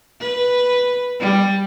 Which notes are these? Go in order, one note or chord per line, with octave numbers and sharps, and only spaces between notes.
B4
G3